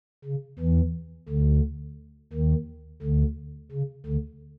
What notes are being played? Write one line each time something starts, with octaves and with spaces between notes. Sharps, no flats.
C#3
E2 E3
D2 D3
D#2 D#3
D2 D3
C#3
D2 D3